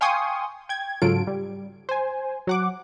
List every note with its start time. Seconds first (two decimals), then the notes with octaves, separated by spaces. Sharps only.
0.01 F5 G5 G#5 C6 C#6 D#6
0.69 G5 G#6
1.02 G#2 C#3 F#3 F4 A4 D7
1.27 G3
1.89 C5 G#5
2.47 F#3 F#5 D6